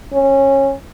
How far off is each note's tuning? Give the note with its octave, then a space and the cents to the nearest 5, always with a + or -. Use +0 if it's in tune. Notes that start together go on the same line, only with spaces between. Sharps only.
C#4 -20